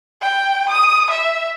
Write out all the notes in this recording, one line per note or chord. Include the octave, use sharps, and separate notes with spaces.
G5
D#6
E5